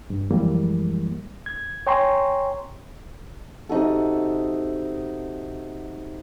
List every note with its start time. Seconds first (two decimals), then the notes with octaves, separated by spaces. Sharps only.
0.10 G2
0.31 F#2 E3 F3 G3 G#3 A#3
1.46 G#6
1.87 C#5 G5 G#5 A#5 C6 C#6
3.69 C3 D#4 F#4 A4